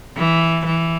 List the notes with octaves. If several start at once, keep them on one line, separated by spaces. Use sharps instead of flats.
E3
E3